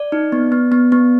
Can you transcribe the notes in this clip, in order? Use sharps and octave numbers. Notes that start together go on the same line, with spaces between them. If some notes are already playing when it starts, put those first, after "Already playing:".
Already playing: D5
D#4
B3
B3
B3
B3